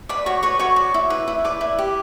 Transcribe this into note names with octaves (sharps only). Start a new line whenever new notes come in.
B4 D5 B5
F#4 C#5 C#6
B4 C#5 C#6
F#4 C#5 C#6
D5
E4
B4
E4
B4 D5 D6
E4
G4